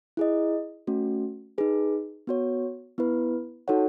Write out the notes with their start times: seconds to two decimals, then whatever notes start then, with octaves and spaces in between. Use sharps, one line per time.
0.17 E4 G#4 D#5
0.87 A3 C#4 F#4
1.58 D#4 G#4 B4
2.27 B3 F#4 C#5
2.98 B3 E4 B4
3.68 D#4 F#4 A4 C#5 F#5